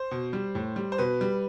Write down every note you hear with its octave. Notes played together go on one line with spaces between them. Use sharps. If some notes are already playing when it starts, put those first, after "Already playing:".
Already playing: C5
B2
G3
A2
G3
C5
B2 B4
G3